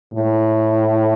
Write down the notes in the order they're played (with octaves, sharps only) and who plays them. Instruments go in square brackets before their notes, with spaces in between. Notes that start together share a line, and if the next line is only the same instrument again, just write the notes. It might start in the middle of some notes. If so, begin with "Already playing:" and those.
[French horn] A2